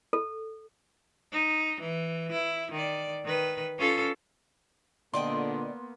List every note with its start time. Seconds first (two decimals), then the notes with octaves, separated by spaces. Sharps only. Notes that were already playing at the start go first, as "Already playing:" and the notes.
0.13 A4
1.33 D#4
1.81 E3
2.32 E4
2.72 D#3 D5
3.25 D#3 B4
3.79 C#4 F4 A4
5.14 A#2 D3 A#3 B3 D5 D#5 G5 C6